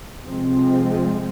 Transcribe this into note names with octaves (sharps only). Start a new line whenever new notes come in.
C3 F3 G#3 C4